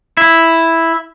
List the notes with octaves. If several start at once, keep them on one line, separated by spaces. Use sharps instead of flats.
E4